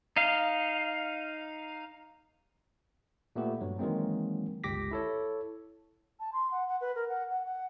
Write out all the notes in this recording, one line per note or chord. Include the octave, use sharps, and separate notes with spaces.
D#4 F5
A#2 A3 B3 G4
G2 F#3
D#3 E3 F#3 G#3 A#3 C4
G1 C#2 G4 D6 A#6 B6
E4 A4 C#5
A5
C6
F#5
F#5
B4
A#4
F#5
F#5
F#5